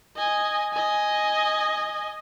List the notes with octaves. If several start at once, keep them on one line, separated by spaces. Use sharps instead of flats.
D#5 G#5
D#5 G#5